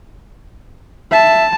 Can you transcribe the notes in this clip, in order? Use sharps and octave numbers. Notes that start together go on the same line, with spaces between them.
E5 A5